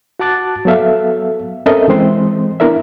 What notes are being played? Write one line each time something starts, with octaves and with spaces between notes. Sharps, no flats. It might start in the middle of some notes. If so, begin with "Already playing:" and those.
F#4 F#5 A5 D6 F#6 A6
F#3 B3 A4 E5 F5
C4 C#4 A4 A#4 D#5 E5
E3 G#3 C4 C6
B3 D4 E4 A#4 D5 E5